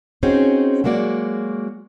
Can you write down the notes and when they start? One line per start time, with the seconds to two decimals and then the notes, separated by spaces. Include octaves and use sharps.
0.23 C4 C#4 D#4 F#4 G#4 C5
0.84 F#3 G#3 A#3 F#4 D5